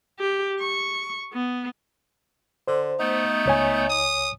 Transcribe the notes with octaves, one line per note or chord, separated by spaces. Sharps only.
G4
C#6
B3
D3 C5
A3 B3 D#4 G6
C#2 C#5 G#5
D#6